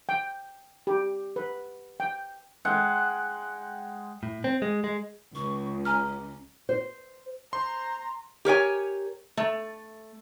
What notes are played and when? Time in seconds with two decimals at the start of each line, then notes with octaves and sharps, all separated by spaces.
0.09 G5
0.87 G4
1.36 B4
2.00 G5
2.65 G#3 F#5 G5
4.23 A2
4.44 C4
4.62 G#3
4.84 G#3
5.35 C#2 C#6
5.85 C#4 G#5 A#5 F6
6.69 C5
7.53 C5 A#5 C6
8.45 G4 A#4 C#5 G#5
9.37 A3